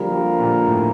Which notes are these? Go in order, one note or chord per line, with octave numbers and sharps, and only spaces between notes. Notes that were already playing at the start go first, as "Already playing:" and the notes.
Already playing: D3 F3 G3 A#3 F4 A#4
G3
A#2
A2